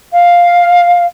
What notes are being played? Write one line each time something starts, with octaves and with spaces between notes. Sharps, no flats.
F5